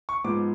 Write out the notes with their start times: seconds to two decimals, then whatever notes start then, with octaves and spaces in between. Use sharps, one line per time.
0.09 C#6
0.24 G#2 F3 G#3 B3 D6